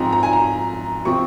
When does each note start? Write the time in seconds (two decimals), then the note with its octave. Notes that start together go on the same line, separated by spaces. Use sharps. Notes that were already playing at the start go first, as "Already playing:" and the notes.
Already playing: G#2 F3 C4 A#5
0.12 A#5
0.23 G#5
0.33 A#5
1.05 C3 F3 C4 C#6